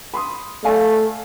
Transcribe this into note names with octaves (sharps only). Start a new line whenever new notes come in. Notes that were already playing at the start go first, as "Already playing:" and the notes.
B5 C6 D#6
A3 D5 F5 G#5